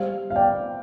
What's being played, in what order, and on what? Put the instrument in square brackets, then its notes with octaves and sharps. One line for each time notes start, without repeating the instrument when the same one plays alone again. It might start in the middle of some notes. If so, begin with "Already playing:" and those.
Already playing: [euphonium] G3 [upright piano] C5 F5
[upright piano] F5
D5 G5